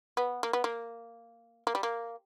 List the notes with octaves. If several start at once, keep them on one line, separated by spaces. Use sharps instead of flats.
B3
A#3
B3
A#3
A#3
G3
A#3